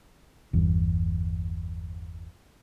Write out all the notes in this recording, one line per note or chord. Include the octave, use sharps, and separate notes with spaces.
G1 E2